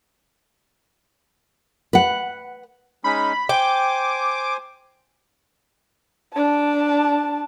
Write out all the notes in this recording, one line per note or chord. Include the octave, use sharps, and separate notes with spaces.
B4 F#5
G#3 C#4 D#4 B5
C5 G5 G#5 D6
D4 A5